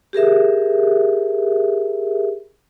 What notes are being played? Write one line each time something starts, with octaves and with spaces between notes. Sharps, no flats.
G4 G#4 A#4 E5